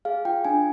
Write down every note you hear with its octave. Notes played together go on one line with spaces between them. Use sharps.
G#4 F5
F4 G5
D4 G#5